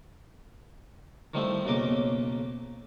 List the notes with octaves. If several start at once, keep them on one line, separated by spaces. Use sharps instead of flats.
D#3 F3 G3 A3 D#4 E4
B1 F2 C#3 A#3 D#5 D6